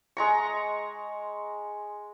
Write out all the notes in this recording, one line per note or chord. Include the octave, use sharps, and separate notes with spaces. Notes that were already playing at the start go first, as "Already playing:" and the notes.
G#3 A#5 C#6